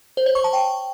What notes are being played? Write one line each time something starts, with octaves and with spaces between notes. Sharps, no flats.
C5
C#5
C#6
A5
G5